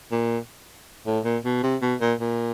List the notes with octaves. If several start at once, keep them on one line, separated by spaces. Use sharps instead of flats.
A#2
A2
A#2
B2
C3
B2
A#2
A#2